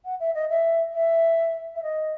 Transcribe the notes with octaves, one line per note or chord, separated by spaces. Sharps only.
F#5
E5
D#5
E5
E5
E5
D#5